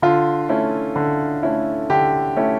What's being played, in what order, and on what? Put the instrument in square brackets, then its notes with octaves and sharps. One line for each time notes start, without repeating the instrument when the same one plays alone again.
[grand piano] D3 F4
A3 C#4 E4
D3
A3 C#4 E4
D3 G4
A3 C#4 E4